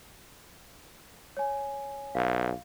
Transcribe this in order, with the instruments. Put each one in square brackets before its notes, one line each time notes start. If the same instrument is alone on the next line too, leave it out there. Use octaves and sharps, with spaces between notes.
[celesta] C#5 G#5
[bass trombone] B1 [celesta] F5